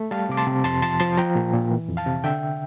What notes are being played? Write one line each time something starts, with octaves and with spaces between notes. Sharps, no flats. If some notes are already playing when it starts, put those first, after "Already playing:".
Already playing: A3
G3 F5 A5
C3 D6
A5 C6
C3
F2 A5 C6
F3 A5 C6
F3 A5 C6
F3 G5 A#5
A#2
A#2
E3
F2
F5 A5
C3
D3 E5 G5